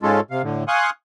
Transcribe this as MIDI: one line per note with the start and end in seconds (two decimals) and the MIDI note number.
0.03 0.20 44
0.03 0.20 56
0.03 0.20 61
0.03 0.20 65
0.03 0.20 69
0.31 0.42 48
0.31 0.42 77
0.43 0.64 45
0.43 0.64 50
0.68 0.90 77
0.68 0.90 80
0.68 0.90 84
0.68 0.90 85
0.68 0.90 87
0.68 0.90 90